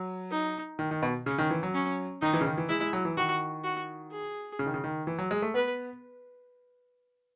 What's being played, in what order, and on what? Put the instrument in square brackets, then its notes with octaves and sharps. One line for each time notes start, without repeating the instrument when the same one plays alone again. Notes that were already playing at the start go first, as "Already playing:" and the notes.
Already playing: [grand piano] F#3
[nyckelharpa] D#4
[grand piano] D#3
D#3
B2
[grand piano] C#3 [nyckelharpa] C#4
[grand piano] D#3
E3
F#3
[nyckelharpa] C#4
[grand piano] D#3 [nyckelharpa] D#4
[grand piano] E3
C#3
D#3
E3
[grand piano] G#3 [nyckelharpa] E4
[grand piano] G#3
F#3
E3
[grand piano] D#3 [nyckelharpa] F#4
[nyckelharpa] F#4
G#4
[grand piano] C#3
D#3
C#3
D#3
E3
F#3
G#3
A3
[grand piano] B3 [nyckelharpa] B4